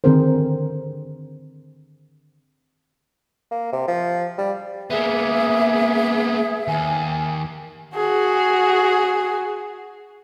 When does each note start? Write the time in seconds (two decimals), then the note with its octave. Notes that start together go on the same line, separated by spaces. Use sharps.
0.04 D3 D#3 C4 G#4 A#4 C5
3.51 A#3
3.72 C3
3.88 F3
4.38 G3
4.90 A#3 B3 G#4 E5
6.68 D#2 G#5
7.95 F#4 G#4